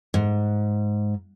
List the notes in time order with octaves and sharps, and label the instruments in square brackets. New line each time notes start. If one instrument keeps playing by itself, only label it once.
[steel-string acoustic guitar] G#2